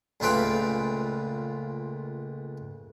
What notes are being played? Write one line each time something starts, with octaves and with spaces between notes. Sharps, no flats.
C#2 A#2 A3 F4 B4 G5